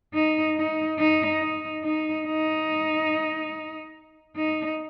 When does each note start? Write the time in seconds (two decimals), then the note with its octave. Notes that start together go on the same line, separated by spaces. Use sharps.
0.14 D#4
0.56 D#4
0.98 D#4
1.40 D#4
1.83 D#4
2.25 D#4
4.36 D#4